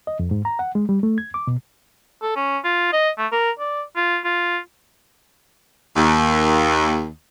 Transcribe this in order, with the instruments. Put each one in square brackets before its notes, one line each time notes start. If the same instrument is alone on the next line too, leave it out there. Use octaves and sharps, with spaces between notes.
[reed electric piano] D#5
F2
G#2
A#5
F#5
G#3
G3
A3
G#6
D6
B2
[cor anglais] A4
C#4
F4
D#5
A3
A#4
D5
F4
F4
[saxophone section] D#2